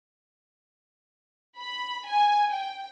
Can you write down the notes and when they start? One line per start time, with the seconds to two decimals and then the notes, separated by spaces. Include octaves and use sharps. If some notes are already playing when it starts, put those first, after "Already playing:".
1.59 B5
2.07 G#5
2.53 G5